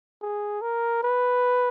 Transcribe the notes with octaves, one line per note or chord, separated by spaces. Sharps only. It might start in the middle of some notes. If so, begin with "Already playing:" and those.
G#4
A#4
B4